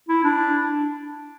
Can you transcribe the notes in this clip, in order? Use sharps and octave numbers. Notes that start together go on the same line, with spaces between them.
E4
D4